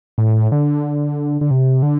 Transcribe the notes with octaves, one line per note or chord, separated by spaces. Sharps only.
A2
D3
D3
C3
D3